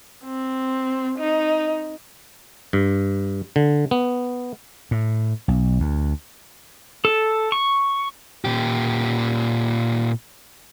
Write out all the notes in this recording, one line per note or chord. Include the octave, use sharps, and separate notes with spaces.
C4
D#4
G2
D3
B3
A2
B1
D2
A4
C#6
A#2 G4